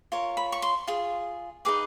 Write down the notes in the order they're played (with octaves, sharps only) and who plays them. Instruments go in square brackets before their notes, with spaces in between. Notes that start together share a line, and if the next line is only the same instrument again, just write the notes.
[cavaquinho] F4 A#4 C#5
B5
C#6
C6
F4 G#4
D#4 G#4 B4 D6